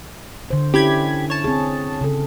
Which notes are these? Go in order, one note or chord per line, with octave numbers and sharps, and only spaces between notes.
D3 C5
C#4 D4 E4 G4 B5 G#6
C#5 A5
C4 G#4
C#3 A4